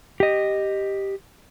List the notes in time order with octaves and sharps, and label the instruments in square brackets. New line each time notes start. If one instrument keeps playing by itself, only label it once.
[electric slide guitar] G4 D#5